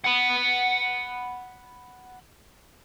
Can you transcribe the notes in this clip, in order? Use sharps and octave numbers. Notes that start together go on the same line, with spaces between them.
F#5 B5